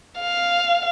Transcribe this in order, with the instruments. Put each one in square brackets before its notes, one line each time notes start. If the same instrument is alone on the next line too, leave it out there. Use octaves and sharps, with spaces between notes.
[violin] F5